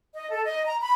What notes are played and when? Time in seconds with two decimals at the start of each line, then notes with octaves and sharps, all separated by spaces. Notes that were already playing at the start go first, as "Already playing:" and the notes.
0.14 D#5
0.30 A4
0.44 D#5
0.65 A#5
0.81 B5